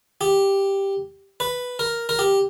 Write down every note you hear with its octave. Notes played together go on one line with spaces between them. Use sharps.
G4
B4
A#4
A#4
G4